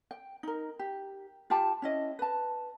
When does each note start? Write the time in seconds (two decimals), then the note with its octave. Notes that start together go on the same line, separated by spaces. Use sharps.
0.11 G5
0.43 D#4 A#4
0.79 G4
1.50 F4 G4 G5 A5
1.82 C#4 E4 D#5
2.19 B4 A5